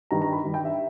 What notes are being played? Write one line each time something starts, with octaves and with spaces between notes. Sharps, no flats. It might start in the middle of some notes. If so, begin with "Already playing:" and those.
G2 D#3 G3 A#5
A#5
B5
G2 D#3 G3
G5
E5